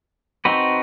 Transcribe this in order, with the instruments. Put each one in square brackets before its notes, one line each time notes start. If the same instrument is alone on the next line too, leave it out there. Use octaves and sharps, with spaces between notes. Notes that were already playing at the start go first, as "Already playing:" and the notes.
[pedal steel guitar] C4 D#4 F#4 B4